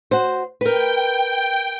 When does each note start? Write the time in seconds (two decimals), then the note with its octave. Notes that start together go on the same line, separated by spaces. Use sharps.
0.11 F#4 C5
0.61 A#4 B4 G5